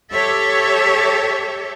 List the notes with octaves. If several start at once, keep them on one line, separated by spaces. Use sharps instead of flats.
G4 A4 C#5 E5